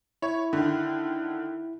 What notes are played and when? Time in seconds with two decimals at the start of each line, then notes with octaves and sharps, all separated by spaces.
0.22 E4 C#5
0.53 D3 D#3